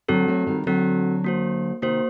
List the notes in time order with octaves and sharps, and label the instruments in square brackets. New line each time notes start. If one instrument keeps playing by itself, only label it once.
[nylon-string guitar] D3 F#3 [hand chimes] C4 F#4 A4
[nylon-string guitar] F#3 A3
D#3 G3
[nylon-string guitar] D3 F#3 [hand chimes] C4 F#4 A4
[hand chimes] A#3 F#4 C5
[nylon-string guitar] C3 D#3 [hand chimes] A#3 F#4 C5